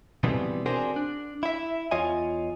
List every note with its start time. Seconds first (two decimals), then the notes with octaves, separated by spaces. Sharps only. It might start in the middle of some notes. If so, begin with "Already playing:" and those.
0.24 B2 E3 G3 B3 C4
0.66 C4 D4 F#4 G#4 A#4 C5
0.96 D4
1.43 E4 E5
1.91 E2 F4 C#5 D#5 G#5